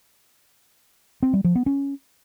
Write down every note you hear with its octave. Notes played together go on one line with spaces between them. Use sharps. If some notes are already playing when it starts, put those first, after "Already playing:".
C4
G3
F3
B3
C#4